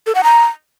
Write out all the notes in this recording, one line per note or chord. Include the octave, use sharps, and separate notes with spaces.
A4
F#5
A#5